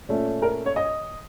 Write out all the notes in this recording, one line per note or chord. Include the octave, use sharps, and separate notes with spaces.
A#2 A3 C#4
A#4
C#5
D#5